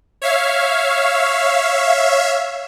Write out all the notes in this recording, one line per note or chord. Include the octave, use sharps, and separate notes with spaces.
C#5 E5 F5